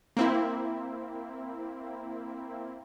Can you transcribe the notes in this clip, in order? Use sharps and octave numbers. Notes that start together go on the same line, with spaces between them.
A#3 C4 E4